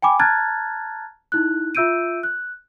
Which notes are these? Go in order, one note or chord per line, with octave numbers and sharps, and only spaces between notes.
G5 G#5 B5 D6
A5 A#5 F6 F#6 G#6 A6
D#4 E4 F#6
F4 E5 E6 G6 D7 D#7
F#6